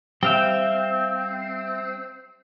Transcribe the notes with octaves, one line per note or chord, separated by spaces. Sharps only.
G3 C4 E5 F5 G5